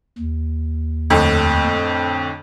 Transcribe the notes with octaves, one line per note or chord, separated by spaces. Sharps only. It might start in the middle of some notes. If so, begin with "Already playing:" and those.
D#2
F2 A2 D3